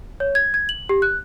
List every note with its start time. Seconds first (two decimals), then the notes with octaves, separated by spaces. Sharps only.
0.20 C#5
0.35 G#6
0.54 G#6
0.69 F#7
0.89 G4
1.02 F#6